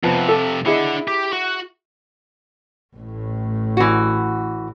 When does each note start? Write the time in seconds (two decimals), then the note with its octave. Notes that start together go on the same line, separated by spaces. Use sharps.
0.03 F2 C3 F3 B3
0.29 A4
0.66 D4 E4 G#4 D#5 F#5
1.08 G4
1.33 F#4
2.96 A1 A2
3.77 E3 F#4